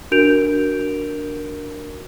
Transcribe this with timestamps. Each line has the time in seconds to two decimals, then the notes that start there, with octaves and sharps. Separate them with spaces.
0.11 D4 F#4 A#4 G6 D7 F7